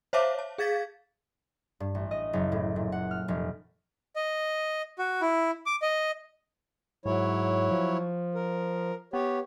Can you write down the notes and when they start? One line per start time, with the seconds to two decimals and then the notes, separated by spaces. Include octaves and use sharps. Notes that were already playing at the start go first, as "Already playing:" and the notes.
0.13 C5 C#5 E5 F5 A5 D6
0.39 A5
0.58 G#4 F5 G#6 A6 B6
1.80 G2
1.95 A1
2.11 D#5
2.33 F#1
2.52 A2
2.76 A#2
2.92 F#5
3.11 F6
3.28 F1
4.16 D#5
4.99 F#4
5.21 E4
5.66 D6
5.82 D#5
7.05 G#2 F#3 E4 C#5
7.71 F3
8.35 A#4
9.13 B3 G4 C#5